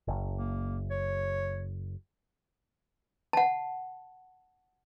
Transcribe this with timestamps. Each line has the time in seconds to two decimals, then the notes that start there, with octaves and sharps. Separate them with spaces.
0.08 F#1
0.37 A#3
0.91 C#5
3.33 F#5 A5